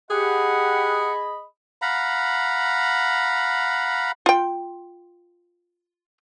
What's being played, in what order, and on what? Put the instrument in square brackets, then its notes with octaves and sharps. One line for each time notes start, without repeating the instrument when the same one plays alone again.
[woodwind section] G4 F#5 [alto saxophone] G#4 [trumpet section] D#5 B5
[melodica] F5 F#5 A#5 B5
[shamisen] F4 G5